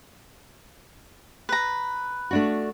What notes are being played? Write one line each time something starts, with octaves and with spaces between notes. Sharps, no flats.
B4 A#5
A3 D4 F#4